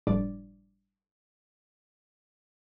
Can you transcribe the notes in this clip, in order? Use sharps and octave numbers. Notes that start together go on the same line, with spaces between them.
G1 A2 F3 G3 D4 D5